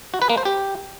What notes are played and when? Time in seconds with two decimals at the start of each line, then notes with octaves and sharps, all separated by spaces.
0.14 F#4
0.22 B4
0.30 A#3
0.37 C5
0.45 G4